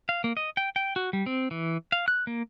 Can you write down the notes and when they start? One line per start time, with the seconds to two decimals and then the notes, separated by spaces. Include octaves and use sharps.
0.09 F5
0.24 A#3
0.37 D#5
0.57 G5
0.76 G5
0.96 F#4
1.13 G3
1.26 C4
1.51 E3
1.92 F5
2.08 F#6
2.27 A#3